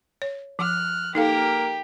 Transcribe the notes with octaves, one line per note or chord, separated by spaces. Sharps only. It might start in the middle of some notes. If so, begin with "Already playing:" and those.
C#5
F3 F6 F#6
A#3 D#4 G4 A4 A#4 F5